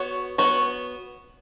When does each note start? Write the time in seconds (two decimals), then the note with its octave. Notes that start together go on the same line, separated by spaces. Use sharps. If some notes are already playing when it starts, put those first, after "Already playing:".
Already playing: B3 F#4 C#5
0.38 B3 F#4 C#5